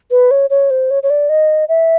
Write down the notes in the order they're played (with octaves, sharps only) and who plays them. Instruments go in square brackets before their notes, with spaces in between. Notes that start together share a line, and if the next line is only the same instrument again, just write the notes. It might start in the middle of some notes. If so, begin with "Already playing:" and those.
[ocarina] B4
C#5
C#5
C5
C#5
C#5
D5
D#5
E5